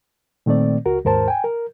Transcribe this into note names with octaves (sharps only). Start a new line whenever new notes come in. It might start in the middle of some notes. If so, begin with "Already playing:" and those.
A#2 D#3 A3 C4 D5
C#2 F#4 A#4
D#2 G#2 A#4 C5 A5
G5 G#5
A#4